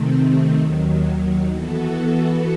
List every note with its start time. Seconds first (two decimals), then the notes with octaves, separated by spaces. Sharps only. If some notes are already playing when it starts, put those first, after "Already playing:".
Already playing: C3 D#3 A3 C4
0.58 D#2 D#3 F#3
1.48 E3 B3 F#4 A4